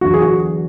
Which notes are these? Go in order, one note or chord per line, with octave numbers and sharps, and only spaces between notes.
E2 D3 F#3 F#4
G#4
F#4